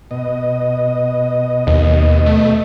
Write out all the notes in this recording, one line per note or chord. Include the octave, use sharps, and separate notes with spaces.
B2 D#5
D#2
A3